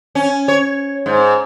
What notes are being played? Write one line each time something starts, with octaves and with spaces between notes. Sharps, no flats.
C#4
C#5
G#2